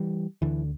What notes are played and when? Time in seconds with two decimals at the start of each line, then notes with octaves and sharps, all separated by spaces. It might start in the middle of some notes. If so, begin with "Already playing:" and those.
Already playing: E3 G3
0.42 D2 D3 E3